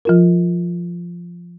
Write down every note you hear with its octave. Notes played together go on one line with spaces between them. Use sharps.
F3 F4 A#4